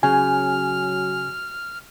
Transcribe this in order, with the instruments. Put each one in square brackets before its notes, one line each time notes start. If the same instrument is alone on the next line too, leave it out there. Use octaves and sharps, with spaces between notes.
[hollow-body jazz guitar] C#3 [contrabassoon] F#3 [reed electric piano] G#5 [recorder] F6